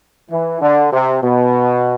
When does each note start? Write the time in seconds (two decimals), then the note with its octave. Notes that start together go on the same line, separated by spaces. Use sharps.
0.30 E3
0.61 D3
0.91 C3
1.23 B2